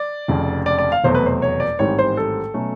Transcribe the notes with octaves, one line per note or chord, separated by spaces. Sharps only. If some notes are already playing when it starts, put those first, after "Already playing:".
Already playing: D5
F1 F2 C#3
D5
D5
F5
F1 E2 B2 F#3 A3 C5
B4
C5
C#5
D5
A1 G#2 D#3 G3 C4 C#5
C5
A4
B2 F#3 A3 C#4